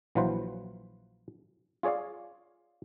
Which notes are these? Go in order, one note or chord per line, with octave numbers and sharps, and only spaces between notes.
A#1 E3 F#3 F4 B4 C5
F4 G#4 C#5 D5 F5